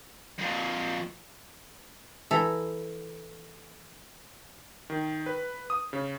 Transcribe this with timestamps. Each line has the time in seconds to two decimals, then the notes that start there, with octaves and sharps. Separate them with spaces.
0.38 F2 A#2
2.31 E3 A4 A#5
4.90 D#3
5.26 B4
5.70 D#6
5.93 C#3